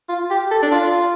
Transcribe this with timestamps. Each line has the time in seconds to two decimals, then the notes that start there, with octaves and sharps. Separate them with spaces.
0.09 F4
0.30 G4
0.51 A4
0.63 D4
0.72 F4